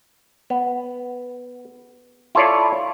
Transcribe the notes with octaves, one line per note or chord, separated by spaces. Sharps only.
B3
E4 F4 A4 C#5 D5